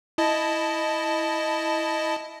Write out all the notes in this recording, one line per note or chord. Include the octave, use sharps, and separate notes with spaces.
E4 D#5 A5